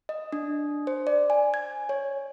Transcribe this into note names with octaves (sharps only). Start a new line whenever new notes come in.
D#5
D4
C5
D5
G#5
G#6
C#5